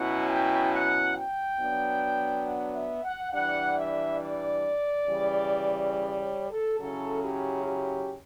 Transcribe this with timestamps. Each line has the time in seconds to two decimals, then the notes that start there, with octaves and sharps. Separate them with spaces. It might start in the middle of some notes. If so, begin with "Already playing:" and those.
Already playing: B2 F#3 C#4 E4 F#5
0.29 G5
0.72 F#5
1.15 G5
1.58 F#3 B3 D4
2.45 F#5
2.74 E5
3.04 F#5
3.33 E3 G3 D4 F#5
3.76 E5
4.19 D5
5.06 C#3 E3 G3
5.93 D5
6.22 C#5
6.51 A4
6.80 C#3 F#3 C#4 E4 A4
7.24 G4
7.66 G4